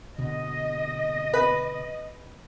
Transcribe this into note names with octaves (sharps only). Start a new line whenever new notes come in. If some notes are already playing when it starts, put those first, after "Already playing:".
B2 D3 D#5
B4